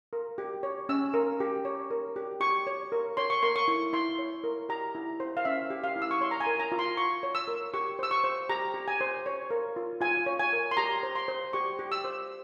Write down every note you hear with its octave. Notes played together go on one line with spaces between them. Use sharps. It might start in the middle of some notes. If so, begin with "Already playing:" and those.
A#4
G4
C#5
C#4 E6
A#4
G4
C#5
A#4
G4
G4 C#6
C#5
A#4
C#5 C6
C#6
A#4 C6
C#6
E4
E4 C6
C#5
A#4
G4 A#5
E4
C5
F5
C#4 E5
G4
F5
E4
E6
C#6
C#5 C6
A#5
G#5
A#4
A#5
F4
C6
F4 C#6
C#5
E6
A#4
G4 C#6
C5 E6
C#6
C5
G4 A#5
G4
G#5
C5
C#5
A#4
F4
F4 G#5
C#5
G#5
A#4
C6
G4 A#5
C5
C6
C5
G4 C#6
G4
E6
C5